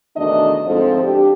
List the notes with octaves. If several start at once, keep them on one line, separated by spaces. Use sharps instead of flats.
E2 B2 D#3 A3 D4 D#5
D2 G#2 F3 C4 A4
D4 G4